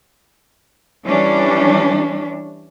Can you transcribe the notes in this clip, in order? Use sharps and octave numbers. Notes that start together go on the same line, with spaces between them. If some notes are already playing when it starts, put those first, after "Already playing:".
E3 G3 C#4 D4